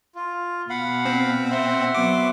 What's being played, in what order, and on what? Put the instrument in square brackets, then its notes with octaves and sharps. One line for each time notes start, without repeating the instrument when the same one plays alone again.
[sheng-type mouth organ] F4
[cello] B2 [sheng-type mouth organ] F5 F#5 B5
[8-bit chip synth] C4
[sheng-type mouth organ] E5 F#5 C6
[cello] F#3 B3 [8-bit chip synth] D6